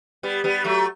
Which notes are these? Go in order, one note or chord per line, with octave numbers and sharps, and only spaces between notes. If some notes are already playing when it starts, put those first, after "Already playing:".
G3 B3
G3 B3
F#3 A3